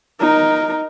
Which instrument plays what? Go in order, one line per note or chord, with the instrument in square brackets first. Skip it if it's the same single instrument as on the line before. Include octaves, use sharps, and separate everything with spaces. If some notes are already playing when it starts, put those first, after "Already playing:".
[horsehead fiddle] D#4 A#4